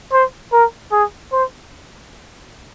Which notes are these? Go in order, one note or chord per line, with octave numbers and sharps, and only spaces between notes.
C5
A#4
G#4
C5